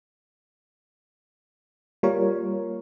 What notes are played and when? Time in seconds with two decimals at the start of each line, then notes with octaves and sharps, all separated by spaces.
2.03 G3 A#3 F4 A#4 C#5